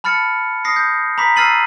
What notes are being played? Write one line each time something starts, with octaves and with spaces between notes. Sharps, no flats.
A5 B5 F6 A6 C#7
D#6 A#6 C7
G6
A#5 B5 D6 B6
E6 F6 A6 C7 D#7 F#7